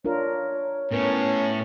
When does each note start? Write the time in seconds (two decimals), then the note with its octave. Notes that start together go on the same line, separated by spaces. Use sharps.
0.05 D4 F4 A#4 C#5
0.91 A2 B3 C#4 A#4 B4